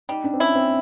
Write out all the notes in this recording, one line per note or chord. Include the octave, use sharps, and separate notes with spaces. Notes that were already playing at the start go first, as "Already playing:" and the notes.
G3 D#4
D4
C4
C#4 E4
C4